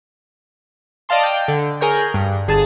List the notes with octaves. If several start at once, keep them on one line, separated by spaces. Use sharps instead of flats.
D5 D#5 F5 A5 C6
G5 D7
D3
G#4 A#4 C#5 G6
G2
G1 G#4 A5